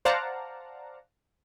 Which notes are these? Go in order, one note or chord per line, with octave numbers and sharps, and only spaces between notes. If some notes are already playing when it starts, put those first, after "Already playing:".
C5 D5 F5 F#5 A5 A#5